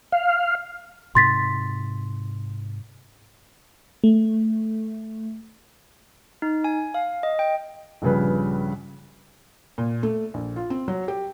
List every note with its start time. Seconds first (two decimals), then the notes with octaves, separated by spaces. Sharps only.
0.12 F5
1.15 G#2 C3 C6 A6 B6
4.04 A3
6.42 D#4
6.64 G#5
6.94 F5
7.23 D#5
7.39 G5
8.02 A#1 G2 C#3 B4
9.78 A#2
10.03 A3
10.34 A#1
10.56 F4
10.70 C4
10.88 F#3
11.08 G4